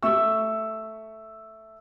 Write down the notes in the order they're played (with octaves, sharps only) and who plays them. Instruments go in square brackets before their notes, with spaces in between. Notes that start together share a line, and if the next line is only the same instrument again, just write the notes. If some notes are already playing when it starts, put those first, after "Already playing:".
[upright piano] A3 E5 C#6 E6